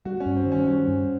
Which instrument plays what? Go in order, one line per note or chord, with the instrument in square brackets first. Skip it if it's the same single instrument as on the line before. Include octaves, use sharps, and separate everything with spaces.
[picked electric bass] G3 [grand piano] F#4
[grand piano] C#4
[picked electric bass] G2
[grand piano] C4
[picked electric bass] D#3
[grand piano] C#4
[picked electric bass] G3 [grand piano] C#4
[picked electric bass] G2